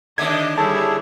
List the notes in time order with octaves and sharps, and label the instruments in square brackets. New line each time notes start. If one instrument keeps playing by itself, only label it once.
[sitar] D#2 D3 [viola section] D4 D#5 [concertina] E5 [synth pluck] G#6
[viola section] G3 E4 [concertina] G#4 A4 C#5 [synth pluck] A5